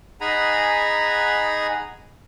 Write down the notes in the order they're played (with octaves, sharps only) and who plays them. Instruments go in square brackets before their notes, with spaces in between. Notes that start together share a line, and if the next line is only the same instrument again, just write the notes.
[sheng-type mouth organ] D#4 G#4 F#5 G#5 A#5 B5